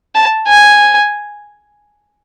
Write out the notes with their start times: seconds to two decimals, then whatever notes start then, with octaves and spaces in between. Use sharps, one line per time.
0.15 A5
0.48 G#5